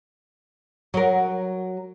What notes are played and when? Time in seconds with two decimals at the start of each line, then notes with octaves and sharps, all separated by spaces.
0.94 F#3 A#4